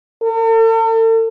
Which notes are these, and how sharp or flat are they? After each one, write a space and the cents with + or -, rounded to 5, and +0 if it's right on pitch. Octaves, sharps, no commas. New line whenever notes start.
A4 +45